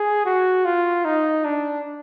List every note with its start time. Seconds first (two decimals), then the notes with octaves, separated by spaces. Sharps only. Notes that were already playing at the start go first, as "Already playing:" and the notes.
Already playing: G#4
0.25 F#4
0.65 F4
1.05 D#4
1.45 D4